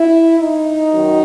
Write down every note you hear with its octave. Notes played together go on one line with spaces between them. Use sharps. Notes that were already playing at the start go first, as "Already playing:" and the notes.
Already playing: E4
D#4
F#2 D#3 F#3